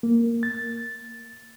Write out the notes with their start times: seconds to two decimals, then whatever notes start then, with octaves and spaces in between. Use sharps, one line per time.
0.03 A#3
0.43 A6